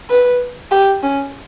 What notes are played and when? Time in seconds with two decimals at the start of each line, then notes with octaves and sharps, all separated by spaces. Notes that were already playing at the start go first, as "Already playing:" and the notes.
0.10 B4
0.71 G4
1.03 C#4